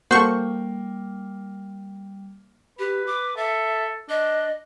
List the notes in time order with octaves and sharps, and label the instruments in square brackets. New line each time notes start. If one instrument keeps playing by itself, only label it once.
[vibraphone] G3 [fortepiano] A#3 [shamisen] F#4 A4 [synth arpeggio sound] C5 C#6
[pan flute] G4 [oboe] B4
[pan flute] D6
[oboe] A4 [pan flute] E5
[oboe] D4 [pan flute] D#5